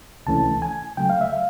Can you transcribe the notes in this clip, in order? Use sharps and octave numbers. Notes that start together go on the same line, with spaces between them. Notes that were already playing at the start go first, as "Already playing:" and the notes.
C#2 C3 E3 A3 C#4 A5
G#5
C#3 F#3 A3 G5
F5
E5
F5